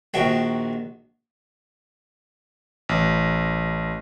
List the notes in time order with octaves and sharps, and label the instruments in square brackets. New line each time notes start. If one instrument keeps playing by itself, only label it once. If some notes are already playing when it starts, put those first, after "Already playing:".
[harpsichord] A#1 D#3 F#4 G5
[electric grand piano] A1